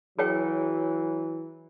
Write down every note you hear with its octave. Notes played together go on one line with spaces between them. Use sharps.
E3 F#3 G#4 C#5 G5